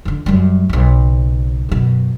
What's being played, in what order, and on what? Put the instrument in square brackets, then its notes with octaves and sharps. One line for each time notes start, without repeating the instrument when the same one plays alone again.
[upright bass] F2 D3
F#2 G3
B1 C#3
F#2 B2